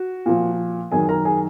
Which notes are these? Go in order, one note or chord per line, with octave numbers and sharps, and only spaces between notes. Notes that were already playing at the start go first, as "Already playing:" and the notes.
Already playing: F#4
A#2 F3
F#2 D#3 G#4 G#5
A#4 A#5
G#4 G#5